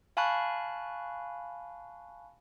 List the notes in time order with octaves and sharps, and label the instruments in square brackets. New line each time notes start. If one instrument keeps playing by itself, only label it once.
[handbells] F5 G#5 A5 B5 C#6 F#6